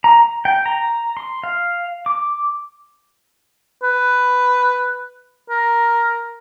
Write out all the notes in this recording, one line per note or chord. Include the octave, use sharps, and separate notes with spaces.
A#5
G5
A#5
C6
F5
D6
B4
A#4